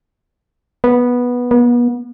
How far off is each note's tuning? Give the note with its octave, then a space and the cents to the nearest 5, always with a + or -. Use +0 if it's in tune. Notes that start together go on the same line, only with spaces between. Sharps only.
B3 -10
B3 -35